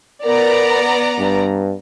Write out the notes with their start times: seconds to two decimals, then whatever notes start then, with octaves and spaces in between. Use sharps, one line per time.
0.25 B3 A#4 D5 A#5
1.19 G2